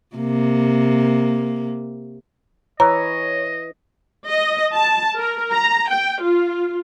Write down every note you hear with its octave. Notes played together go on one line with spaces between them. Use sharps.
C3 A#3
E3 C#5 D#5 A#5
D#5
A5
A#4
A#5
G5
F4